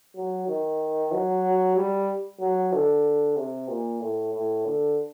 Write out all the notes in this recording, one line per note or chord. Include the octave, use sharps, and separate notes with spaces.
F#3
D#3
F#3
G3
F#3
D3
C3
A#2
A2
A2
D3